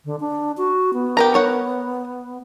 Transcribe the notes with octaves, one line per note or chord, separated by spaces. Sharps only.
D3
D4
F#4
B3
G4 A#4 A#5
A#4 C#5 F#5